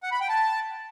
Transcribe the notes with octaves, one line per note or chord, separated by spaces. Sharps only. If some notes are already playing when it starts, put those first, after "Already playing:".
F#5
B5
G5
A5